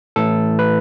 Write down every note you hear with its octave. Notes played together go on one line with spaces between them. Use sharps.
A2 E3 A3 A4
B4